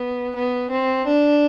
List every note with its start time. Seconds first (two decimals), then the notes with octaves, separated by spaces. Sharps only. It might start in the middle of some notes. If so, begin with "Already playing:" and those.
Already playing: B3
0.35 B3
0.70 C4
1.06 D4